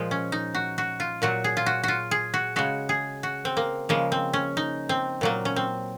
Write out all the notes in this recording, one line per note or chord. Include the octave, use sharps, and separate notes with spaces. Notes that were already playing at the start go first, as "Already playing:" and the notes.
Already playing: A#2 F3 G#3
C#4
D#4
F#4
F#4
F4
A#2 F#3 F#4
G#4
F4
F#4
F4 F#4
G#4
F#4
C#3 G#3 F#4
G#4
F#4
C4
A#3
C#3 F3 G#3 A#3
C4
C#4
D#4
C4
A#2 F#3 A#3
C#4
C4